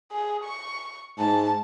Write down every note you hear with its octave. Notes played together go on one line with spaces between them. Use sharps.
G#4
C#6
G#2 A5